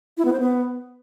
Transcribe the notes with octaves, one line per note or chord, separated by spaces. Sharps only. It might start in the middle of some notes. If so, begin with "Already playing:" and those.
E4
B3
C5
B3